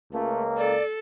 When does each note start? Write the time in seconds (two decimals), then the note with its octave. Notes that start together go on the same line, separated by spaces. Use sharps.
0.12 C#2 A3 A#3
0.58 A4 D5